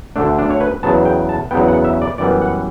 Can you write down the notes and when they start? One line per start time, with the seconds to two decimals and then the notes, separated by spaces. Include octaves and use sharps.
0.16 D2 D3 A3 D4
0.38 D4
0.51 C#5
0.60 B4
0.83 E2 C#3 F#3 B3 A5
1.05 G5
1.29 A5
1.51 E2 C#3 F#3 B3 G5
1.68 F#5
1.84 E5
2.02 D5
2.18 F#2 E3 G3 B3 D5
2.42 F#5